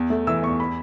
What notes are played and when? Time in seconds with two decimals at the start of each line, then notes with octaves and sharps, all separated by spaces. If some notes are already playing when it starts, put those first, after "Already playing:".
Already playing: E2
0.10 A3
0.27 E3 E6
0.42 E2 C#6
0.60 B5